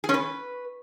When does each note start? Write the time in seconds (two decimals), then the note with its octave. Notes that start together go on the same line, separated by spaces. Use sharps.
0.04 G#4
0.09 C#4
0.14 B4